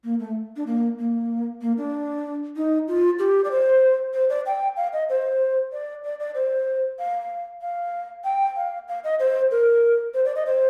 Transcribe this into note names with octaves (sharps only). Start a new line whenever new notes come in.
A#3
A3
D4
A#3
A#3
A#3
D4
D#4
F4
G4
D5
C5
C5
D5
G5
F5
D#5
C5
D5
D5
D5
C5
F5
F5
G5
F5
F5
D#5
C5
A#4
C5
D5
D#5
C5